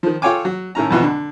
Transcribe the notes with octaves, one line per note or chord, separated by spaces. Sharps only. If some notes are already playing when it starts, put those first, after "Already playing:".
D#3 F3
F4 A4 C#5 G5 G#5 D6
F#3
A2 D#3 C#4 A#5
F2 B2 E3 F3
D3